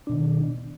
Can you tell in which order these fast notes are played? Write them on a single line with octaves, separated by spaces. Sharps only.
D4 B2 D#3